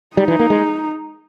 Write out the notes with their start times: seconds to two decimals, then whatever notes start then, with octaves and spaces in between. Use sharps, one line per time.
0.17 G3 D#4
0.28 E3
0.39 A#3
0.50 G#3